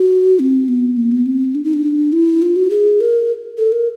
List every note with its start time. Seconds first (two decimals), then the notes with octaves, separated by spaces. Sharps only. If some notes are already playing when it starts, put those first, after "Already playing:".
Already playing: F#4
0.40 C4
0.68 B3
0.97 A#3
1.12 B3
1.26 C4
1.55 D4
1.64 D#4
1.73 D4
2.13 E4
2.42 F4
2.56 F#4
2.70 G#4
3.01 A#4
3.58 A4
3.72 A#4